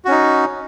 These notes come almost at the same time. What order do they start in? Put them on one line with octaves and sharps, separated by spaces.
F#4 C#4 D#4